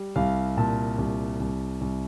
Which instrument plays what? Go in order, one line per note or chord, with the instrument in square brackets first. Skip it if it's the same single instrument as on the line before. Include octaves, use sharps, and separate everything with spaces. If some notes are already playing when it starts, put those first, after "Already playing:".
Already playing: [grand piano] G3
C2 F5
A#2 A5
C2
C2
C2